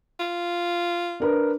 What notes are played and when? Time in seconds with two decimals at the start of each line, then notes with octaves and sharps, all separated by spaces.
0.20 F4
1.20 D4 A#4 B4